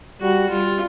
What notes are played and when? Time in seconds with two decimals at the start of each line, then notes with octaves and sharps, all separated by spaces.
0.21 G3 F#4
0.49 G3 F4